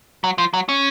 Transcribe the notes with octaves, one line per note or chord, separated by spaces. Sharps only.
F#3
F3
F#3
C#4